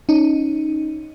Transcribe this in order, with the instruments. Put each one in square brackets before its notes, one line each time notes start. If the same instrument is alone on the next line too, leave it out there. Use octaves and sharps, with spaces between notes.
[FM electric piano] C#4 D#4